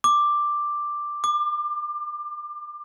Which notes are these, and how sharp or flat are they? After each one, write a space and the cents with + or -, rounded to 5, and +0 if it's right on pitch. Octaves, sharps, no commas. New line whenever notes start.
D6 +5
D6 +30